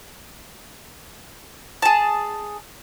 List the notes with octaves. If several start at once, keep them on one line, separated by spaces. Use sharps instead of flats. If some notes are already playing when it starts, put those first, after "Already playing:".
G#4 A5